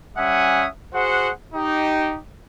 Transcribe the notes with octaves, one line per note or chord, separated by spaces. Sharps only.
G3 C#4 E5 F#5 G#5 D#6
F#4 G#4 C5 F#5
D#4 G4